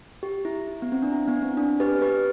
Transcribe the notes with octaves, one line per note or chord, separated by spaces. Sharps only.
G4
E4
E4
B3
C4
D4
E4
B3
C4
D4
G4 B4
G4 B4